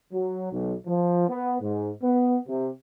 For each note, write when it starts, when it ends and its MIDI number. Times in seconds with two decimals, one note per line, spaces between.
0.12 0.49 54
0.52 0.73 35
0.86 1.27 53
1.28 1.56 59
1.61 1.91 44
2.02 2.36 59
2.47 2.68 48